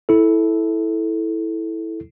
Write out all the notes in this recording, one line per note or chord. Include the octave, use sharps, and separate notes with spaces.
E4 A4